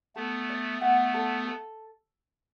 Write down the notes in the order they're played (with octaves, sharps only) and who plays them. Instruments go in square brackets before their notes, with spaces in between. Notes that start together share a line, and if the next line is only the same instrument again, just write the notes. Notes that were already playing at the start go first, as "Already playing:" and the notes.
[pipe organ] A3 B3 [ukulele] A4
[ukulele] D5
[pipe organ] A3 B3 [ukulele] F#5
[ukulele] A4
A4